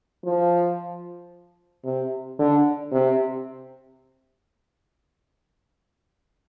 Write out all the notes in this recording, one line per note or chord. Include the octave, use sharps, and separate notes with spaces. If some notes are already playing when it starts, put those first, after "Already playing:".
F3
C3
D3
C3